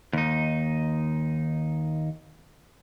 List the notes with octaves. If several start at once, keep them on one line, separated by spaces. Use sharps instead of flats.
D#2 D#4